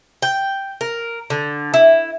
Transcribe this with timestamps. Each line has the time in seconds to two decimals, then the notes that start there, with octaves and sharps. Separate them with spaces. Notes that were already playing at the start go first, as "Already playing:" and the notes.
0.22 G5
0.81 A#4
1.30 D3
1.74 E4